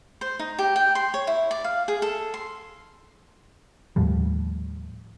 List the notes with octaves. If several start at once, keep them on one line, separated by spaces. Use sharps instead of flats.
C5
D#4
G4
G5
C6
C#5
E4
D5
F5
G#4
A4
C6
D#2 A2 F3 G3